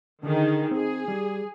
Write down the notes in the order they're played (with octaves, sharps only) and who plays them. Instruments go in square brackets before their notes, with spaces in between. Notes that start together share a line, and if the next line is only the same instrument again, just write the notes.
[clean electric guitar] D3 [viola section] D#3 G#4
[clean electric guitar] C4 [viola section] G#4
[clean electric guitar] G3